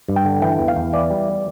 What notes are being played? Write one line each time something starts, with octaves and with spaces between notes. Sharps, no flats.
G2
G5
D3
E3 G5
E2
F5
E2
E3 D5
G3